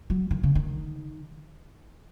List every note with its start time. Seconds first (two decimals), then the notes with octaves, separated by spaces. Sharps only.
0.10 F#3
0.31 D#3
0.43 C#3
0.55 D#3